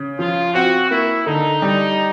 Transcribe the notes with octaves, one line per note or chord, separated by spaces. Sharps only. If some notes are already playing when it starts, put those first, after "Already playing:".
Already playing: C#3
F3 F4
C4 F#4
A#3 E4
D3 D#4
G3